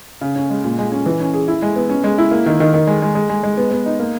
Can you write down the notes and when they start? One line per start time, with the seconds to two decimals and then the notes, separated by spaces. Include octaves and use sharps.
0.21 C#3
0.36 C#4
0.50 G#3
0.64 A#2
0.79 G#3
0.92 C#4
1.06 E3
1.20 C#4
1.34 G#4
1.48 E4
1.62 G#3
1.76 B3
1.89 C#4
2.04 G#3
2.18 E4
2.31 A#3
2.46 D#3
2.60 D#3
2.74 D#3
2.87 G#3
3.02 G#3
3.15 G#3
3.29 G#3
3.43 G#3
3.57 B3
3.71 B3
3.86 D#4
3.99 A#3